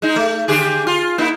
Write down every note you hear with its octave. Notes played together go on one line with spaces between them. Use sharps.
G#3 D#4
A3
D3 G4 G#4
F4
A#3 D#4 E4